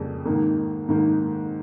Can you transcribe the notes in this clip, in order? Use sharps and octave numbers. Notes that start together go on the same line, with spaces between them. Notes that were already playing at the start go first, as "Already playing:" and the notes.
Already playing: F2 C#3 G3 A#3
G#2 D#3 A#3
G#2 D#3 A#3